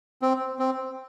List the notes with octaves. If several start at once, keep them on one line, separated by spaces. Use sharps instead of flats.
C4
C4